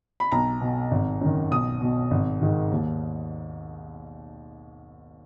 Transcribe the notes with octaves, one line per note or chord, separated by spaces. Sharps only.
B5
B1 A#5
B2
G#1
F#2 D#3
B1 D#6
B2
G#1
G#2 D#3
D#2